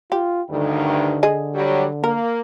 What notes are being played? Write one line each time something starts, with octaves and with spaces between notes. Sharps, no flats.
F4 G4
D2 G2 D3 D#3
G#4 D#5
F#3 G3
A#3 A#4